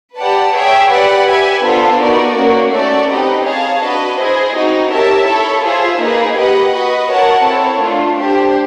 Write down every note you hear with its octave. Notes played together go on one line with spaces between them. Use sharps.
G4 B4 D5 F#5 A5
G#4 C#5 E5 G5
G4 B4 D5 F#5
G4 B4 E5 G#5
B3 D4 F4 A4 C5
B3 D#4 F#4 A#4 D5
A#3 C#4 F#4 A#4
A3 C#4 F#4 A4 D5
C4 D#4 G4 B4 D#5
G#4 C#5 F5 A5
D4 F#4 B4 D#5
E4 G#4 C5 D#5
C4 D#4 F#4
G4 A#4 C#5 E5 A5
E4 A4 C#5
F4 G#4 C5 E5
A#3 D#4 G#4 B4
G4 B4 D#5 F#5
F#4 B4 D#5
F#4 A#4 C#5 F#5 A5
C4 E4 A4 C#5
A3 D4 F4
D4 G4 C5